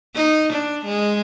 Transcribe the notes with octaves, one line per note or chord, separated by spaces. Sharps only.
D#4
D4
G#3